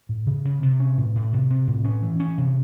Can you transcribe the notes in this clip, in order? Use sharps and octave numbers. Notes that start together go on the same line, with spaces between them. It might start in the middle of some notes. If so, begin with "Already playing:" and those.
A2
C#3
C#3
C3
C#4
A2
A2
C3
C3
A2
C#4
E3
C#4
C3